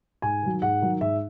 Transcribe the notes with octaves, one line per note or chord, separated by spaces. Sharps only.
G#2 G#5
D#3 F#3
G#2 F#5
D#3 F#3
G#2 E5